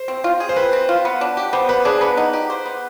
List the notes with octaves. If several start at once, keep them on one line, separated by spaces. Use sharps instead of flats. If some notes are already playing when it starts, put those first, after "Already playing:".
Already playing: C5
C4
F4
G#4
C5
C4 B4
C4
F4
B3
D4
G4
B3 C5
B3 B4
D4 G#4
B3 B4
D#4
G4
C5
B3